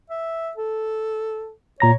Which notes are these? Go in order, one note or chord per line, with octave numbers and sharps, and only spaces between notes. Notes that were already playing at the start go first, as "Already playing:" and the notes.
E5
A4
A#2 C#5 A#5 A#6